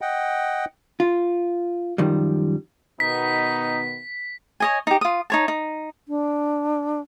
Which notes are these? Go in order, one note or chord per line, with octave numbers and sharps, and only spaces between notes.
D#5 F#5 G5
F4
F#2 D#3 F3 G3
B2 D#3 B3 D#4 B6
C#5 D#5 G#5
D#4 G4
F4 D#6
D#4 C#5 A5
D#4
D4